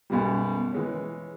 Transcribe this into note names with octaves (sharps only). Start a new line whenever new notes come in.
B1 F#2 B2 G3
E3 G#3 C#4